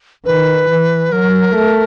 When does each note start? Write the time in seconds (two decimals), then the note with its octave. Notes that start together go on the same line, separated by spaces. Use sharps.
0.25 D#3 B4
0.69 E3
1.12 F#3 A#4
1.55 A3